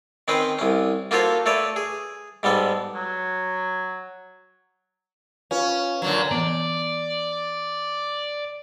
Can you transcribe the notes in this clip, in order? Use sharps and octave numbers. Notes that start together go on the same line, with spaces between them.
D#3 C4 C#4 B4 C5
C2 C#4
A#3 F4 F#4 A4 C5 C#5
A3 A4 B4 C#5 D5
G#4
G#2 G3 B3 A4
F#3
C#4 F4 B4 F5
A#2 D3 F#3
E3 B3 D5